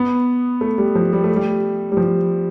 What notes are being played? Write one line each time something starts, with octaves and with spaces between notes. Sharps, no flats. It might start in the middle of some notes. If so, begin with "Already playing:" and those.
Already playing: B3
A3
G3
F3
G3
A3
G3
G3
F3